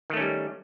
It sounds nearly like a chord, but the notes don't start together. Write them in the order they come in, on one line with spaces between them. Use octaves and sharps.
D#3 A3 C#4 G3